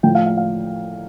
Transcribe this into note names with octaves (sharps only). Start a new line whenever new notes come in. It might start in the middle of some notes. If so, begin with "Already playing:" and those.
A2 F3 G5
F5
F5
F5